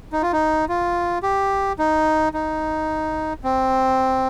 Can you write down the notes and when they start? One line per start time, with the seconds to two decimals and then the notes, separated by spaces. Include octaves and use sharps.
0.13 D#4
0.22 F4
0.33 D#4
0.69 F4
1.23 G4
1.79 D#4
2.34 D#4
3.44 C4